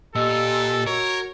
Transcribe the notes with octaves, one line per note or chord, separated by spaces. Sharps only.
A#2 G4 A4 D#5 E6
F#4 A#4 C#5